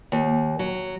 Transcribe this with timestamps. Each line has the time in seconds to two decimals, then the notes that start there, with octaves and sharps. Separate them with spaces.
0.12 D#2
0.59 F#3